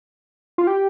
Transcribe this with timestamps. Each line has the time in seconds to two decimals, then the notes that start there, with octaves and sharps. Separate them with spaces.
0.58 F4
0.67 G4